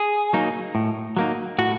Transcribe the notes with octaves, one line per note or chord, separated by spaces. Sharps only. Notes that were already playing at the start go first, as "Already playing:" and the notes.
Already playing: G#4
F#3 A#3 D#4
A2
F#3 A#3 D#4
A2 F#4